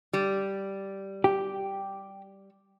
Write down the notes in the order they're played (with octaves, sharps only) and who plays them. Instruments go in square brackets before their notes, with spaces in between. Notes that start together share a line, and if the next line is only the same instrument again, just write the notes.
[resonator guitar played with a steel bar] G3
[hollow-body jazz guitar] G4